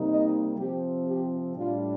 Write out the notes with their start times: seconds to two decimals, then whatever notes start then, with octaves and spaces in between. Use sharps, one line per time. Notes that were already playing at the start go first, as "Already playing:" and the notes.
Already playing: C3 G3 A#3 D#4
0.08 D#5
0.58 C3 F3 C4 G4
1.07 G4
1.56 A2 G3 D4 F4